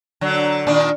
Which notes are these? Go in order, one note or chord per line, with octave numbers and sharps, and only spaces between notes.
D3 F#3
A#2 D#3 D4